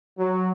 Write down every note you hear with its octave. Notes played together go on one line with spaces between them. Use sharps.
F#3